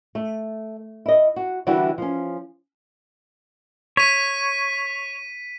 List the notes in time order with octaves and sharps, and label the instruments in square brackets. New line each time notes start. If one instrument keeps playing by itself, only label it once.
[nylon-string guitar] A3
E4 D#5
F#4
D3 E3 G3 E4 F#4
F3 C#4
[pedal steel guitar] C#5 [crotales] B6 D#7